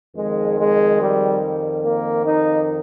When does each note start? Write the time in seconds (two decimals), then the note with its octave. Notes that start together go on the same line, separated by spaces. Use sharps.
0.17 F2 D#3 G#3
0.58 G#3
1.00 G3
1.84 A#3
2.25 D#4